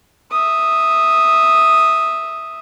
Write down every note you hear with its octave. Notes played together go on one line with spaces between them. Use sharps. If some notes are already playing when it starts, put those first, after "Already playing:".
E5 D#6